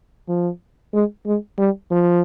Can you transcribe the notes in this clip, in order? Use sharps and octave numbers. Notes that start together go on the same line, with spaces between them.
F3
G#3
G#3
G3
F3